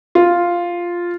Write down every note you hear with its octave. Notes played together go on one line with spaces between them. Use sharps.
F4